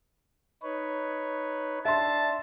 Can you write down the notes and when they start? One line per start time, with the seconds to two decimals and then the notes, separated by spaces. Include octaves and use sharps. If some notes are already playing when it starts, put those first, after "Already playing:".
0.63 D#4 B4 C#5
1.85 D4 E5 A5 C6